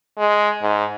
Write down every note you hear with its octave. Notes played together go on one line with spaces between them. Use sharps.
G#3
G#2